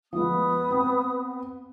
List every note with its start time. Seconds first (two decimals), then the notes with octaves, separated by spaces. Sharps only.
0.13 F3 G#3 B3 D#6
0.70 C4